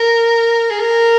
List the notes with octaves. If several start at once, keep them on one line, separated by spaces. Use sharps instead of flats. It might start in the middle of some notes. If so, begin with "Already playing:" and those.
Already playing: A#4
G#4
A#4